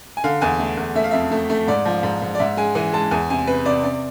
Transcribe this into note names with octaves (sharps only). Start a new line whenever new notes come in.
G#5
D3 F5
E2 G#5
A3
E2
A3 E5
F5
F2 E5
A3
A3
G#2 D5
F3
G#2
G#2
D5
G#2 E5
G#3 G#5
E3 G#5
G#3 A5
E2 G#5
C3 G#5
C3 B4
C3 D5
C3 D5